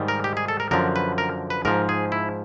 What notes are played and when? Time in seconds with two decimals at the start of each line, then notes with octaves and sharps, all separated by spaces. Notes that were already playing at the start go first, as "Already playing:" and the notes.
Already playing: G#2 D#3 G3
0.08 A#4
0.24 G4
0.37 G#4
0.48 A4
0.60 A#4
0.71 F#2 D3 F3 A#4
0.96 B4
1.18 A#4
1.50 B4
1.65 G#2 F3 A#4
1.89 G#4
2.12 E4